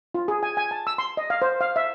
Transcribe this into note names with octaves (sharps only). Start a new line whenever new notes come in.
F4
G#4
G#5
G#5
A5
E6
C6
D#5
F5
C5
F5
E5